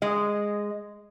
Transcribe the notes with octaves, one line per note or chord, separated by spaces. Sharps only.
G#3 D#5